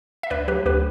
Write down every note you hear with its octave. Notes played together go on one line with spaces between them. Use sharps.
E5
D2 B4 D5
F#3 G4 B4
D2 G4 B4